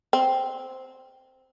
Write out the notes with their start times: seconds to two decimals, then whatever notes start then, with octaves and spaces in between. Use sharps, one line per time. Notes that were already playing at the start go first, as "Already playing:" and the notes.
0.13 C4